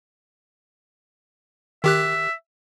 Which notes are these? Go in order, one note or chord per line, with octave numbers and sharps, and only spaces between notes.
D#3 G4 E5 F#6